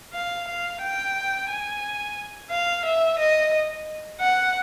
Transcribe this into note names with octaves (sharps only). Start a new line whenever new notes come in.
F5
F5
G5
G#5
F5
E5
D#5
F#5